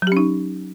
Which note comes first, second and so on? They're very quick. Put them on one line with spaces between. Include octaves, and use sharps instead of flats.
F#3 G4 C#4 D#4